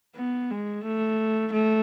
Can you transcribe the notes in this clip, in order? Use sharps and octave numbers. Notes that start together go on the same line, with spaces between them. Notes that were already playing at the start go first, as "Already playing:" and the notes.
B3
G#3
A3
A3